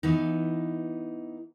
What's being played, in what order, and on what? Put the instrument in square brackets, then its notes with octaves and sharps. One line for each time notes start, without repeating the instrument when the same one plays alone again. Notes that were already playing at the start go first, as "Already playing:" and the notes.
[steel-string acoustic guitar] E3 B3 D#4